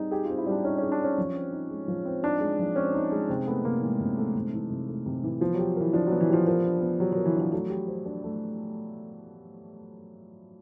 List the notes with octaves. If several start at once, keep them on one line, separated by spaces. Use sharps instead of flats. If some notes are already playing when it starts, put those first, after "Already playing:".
Already playing: G3 C4 D#4 G#4
G4 G#4
C4 F4
E4
G3
D4
C#4 D#4
C#4 G#4
D4
C4 C#4
F3
C4
D#4
G#3
F3
C4
D4 D#4
G#3
F3
C4 C#4
D#4
G#3
C3 C4
A3 B3
C3 A#3
E3 G#3
C3
A3
C3
E3
C3
A3
C3
E3
F3 B3
F#3 G4
E3 A#4
F3 D4
F#3 B3
E3
F3 G4
F3 A#4
D4
B3
F#3 G4
F#3 A#4
E3
D4
F#3
F#3 A3
G4
C5
D4
A3